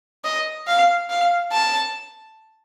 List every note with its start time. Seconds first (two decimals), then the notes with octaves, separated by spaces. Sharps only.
0.24 D#5
0.67 F5
1.10 F5
1.52 A5